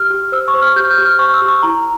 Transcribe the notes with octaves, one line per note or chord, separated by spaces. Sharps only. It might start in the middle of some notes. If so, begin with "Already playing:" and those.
Already playing: G4 F6
G4
C5 E6
C#6
C5
F6
G4 G6
F6
G4
F6
C5 C#6
E6
G4
C#6
E4 A#5